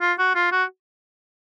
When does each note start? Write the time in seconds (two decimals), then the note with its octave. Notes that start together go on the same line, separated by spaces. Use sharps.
0.01 F4
0.19 F#4
0.35 F4
0.52 F#4